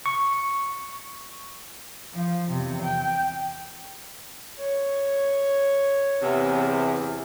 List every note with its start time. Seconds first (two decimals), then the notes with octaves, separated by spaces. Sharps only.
0.06 C#6
2.14 F3
2.52 E2 C3
2.82 G5
4.59 C#5
6.21 E2 C3